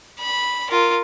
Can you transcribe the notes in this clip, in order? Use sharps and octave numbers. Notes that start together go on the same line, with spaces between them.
B5
F4 A#4